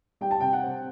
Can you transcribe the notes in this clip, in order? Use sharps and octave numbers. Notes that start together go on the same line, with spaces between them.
G3 G5
A5
C3 G5
F#5
C4